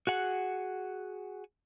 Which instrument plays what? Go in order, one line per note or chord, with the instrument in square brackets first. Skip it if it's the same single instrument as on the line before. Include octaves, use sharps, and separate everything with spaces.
[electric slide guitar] F#4 G#4 F#5